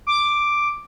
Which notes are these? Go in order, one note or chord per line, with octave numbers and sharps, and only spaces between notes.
D6